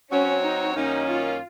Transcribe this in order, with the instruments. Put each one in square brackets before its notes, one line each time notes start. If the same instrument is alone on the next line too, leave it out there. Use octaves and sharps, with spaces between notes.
[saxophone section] F#3 C4 F#4 C#5 [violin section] C#4
[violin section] D#4
[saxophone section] F#2 D#3 A#3 C#4 [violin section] D#4
[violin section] F4